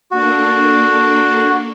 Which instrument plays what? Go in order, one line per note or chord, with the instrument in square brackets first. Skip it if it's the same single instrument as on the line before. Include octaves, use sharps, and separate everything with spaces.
[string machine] A#3 D4 A4 [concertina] F#4